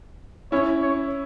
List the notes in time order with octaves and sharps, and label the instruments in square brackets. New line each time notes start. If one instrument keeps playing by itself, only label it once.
[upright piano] C#4 E4 [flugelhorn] C#5
[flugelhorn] C#5